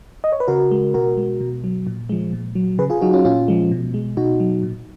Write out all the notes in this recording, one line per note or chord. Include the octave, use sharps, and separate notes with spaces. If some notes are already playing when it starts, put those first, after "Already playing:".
D#5
C#5
B4
C#3 F#4 A#4
G#3
B2 F#4 A#4
G#3
B2
F#3
A#2
F3 G#3
A#2
F#3
C#3 G#4 B4
F4 G#4
F#3 D#4 F#4
C#4 F4
A#2 C#4 F4
F3 G#3
B2
G#3
B2 D#4 F#4
F#3
A#2